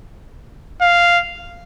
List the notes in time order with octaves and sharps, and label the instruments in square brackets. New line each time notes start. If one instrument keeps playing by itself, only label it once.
[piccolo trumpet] F5